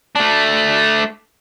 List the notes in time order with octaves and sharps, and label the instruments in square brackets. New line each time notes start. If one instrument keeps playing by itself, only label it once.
[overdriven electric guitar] A3 D4